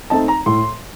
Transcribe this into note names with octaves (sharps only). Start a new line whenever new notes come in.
A3 C4 D#4 A5
A#5
A2 C6